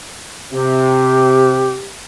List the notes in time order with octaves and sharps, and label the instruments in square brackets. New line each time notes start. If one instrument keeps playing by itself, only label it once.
[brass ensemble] C3 [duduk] G4